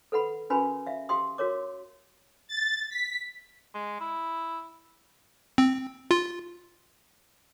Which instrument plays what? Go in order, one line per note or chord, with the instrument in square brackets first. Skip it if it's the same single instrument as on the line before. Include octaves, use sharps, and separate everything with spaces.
[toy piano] A4 B4 F#5 B5
C#4 F#4 A#4 B4 G#5 B5
E5 F5
G4 F5 G5 C6 D#6
F#4 A#4 C#5 D6
[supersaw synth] A6
B6
[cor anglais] G#3
E4
[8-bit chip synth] C4
F4